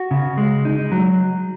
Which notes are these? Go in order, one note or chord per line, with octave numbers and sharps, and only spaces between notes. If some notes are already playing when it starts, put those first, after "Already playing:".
Already playing: F#4
C#3
G#3
D#4
F#3